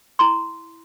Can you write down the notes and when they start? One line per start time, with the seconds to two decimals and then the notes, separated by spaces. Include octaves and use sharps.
0.19 E4 A#5 C6